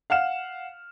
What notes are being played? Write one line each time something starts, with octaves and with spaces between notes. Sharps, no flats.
F5 F#5 F6 E7